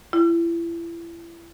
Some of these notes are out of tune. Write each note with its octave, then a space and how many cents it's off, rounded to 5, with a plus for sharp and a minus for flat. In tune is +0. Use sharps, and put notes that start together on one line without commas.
E4 +35